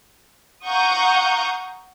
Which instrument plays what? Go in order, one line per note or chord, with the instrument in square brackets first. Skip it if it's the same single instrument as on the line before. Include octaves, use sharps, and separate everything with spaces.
[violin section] F5 F#5 A#5 C#6 D#6 G6